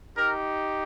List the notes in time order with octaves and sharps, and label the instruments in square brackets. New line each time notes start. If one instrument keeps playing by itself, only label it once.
[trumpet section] D#4 G4 A#4